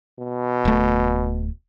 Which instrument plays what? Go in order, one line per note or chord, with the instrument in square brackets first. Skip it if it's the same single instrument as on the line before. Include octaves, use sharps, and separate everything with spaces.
[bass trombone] B2
[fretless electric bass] D1 A3